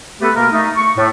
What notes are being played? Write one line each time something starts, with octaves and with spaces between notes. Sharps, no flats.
A3 B3 G4 A4 B4
B2 A#3 A#4
A3 D#4
C#6
A2 A3